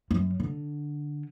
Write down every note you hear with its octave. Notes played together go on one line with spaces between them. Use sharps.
F#2
D3